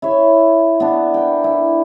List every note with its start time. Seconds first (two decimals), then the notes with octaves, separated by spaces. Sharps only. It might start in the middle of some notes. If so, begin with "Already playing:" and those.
0.02 E4 C#5 E5
0.80 B3 D4
1.14 A#4 G5
1.44 E4